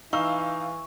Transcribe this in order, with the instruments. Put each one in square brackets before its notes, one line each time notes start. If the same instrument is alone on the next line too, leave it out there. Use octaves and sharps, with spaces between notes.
[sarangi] E3 [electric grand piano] D#4 [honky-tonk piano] F5 E6 [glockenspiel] C#6